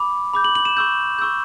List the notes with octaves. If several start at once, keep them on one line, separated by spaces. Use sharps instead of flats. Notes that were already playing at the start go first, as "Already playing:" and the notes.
Already playing: B5 D6
B5 D6 G6
F#7
F#7
E7
C#6 E6 G6
C#6 E6 G6